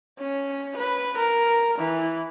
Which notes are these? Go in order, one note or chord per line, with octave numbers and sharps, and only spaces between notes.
C#4
B4
A#4
E3